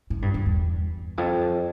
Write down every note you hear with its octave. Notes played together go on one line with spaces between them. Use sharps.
A2
G2
G2
E2
F2